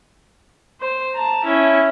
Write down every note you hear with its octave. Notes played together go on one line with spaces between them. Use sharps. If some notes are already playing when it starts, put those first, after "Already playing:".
C5
A5 A#5
C#4 E4